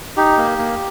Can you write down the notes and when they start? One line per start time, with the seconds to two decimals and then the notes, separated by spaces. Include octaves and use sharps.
0.17 D#4 G4
0.37 A#3
0.58 A#3